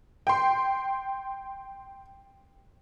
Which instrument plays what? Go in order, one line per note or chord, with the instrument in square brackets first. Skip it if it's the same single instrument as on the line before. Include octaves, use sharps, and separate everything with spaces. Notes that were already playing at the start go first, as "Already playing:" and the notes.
[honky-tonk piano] G5 C6